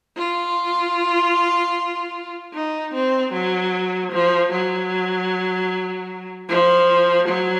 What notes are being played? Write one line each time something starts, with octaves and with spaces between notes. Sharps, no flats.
F4
D#4
C4
F#3
F3
F#3
F3
F#3